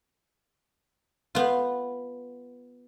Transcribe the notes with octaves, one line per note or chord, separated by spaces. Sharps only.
B3 F4